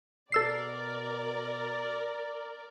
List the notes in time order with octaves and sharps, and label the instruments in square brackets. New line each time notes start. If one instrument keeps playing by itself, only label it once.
[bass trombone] B2 [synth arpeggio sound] A4 E6 C7 [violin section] A#4 D5